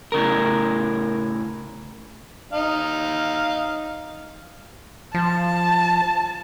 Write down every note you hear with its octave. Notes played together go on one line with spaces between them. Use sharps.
A2 C#3 A#4
D#4 F5
F3 A5